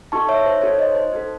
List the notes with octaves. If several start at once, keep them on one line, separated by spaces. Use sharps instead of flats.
D#4 F#4 A4 A5 C#6
C#5 E5
C5
D#4 F#4 A4 C#5
C5 D#5
C5
D#4 F#4 A4